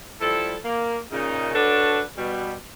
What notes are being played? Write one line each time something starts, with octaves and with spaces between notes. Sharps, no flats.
F3 G3 E4 A4
A#3
A#2 C#3 D#4
D4 F#4 A4 B4 C#5 D5
B2 G3